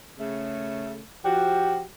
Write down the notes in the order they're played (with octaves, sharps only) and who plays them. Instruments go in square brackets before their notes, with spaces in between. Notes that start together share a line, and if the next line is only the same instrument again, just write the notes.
[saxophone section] C#3 A3
[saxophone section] F3 F#4 [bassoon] G4